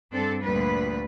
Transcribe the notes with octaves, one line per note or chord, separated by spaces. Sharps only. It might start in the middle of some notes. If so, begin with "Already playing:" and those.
G2 C4 D4 A4
D2 A#2 G3 B4